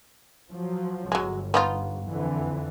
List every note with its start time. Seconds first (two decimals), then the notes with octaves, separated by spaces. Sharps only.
0.50 F3 F#3
1.12 G1 F#3 G#3
1.54 B3 D#4 F4
2.07 F2 D3 E3